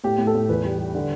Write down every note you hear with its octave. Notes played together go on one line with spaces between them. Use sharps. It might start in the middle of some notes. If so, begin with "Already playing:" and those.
A2 G4
A2
A4
A2
E2 B4
G3
G3
D3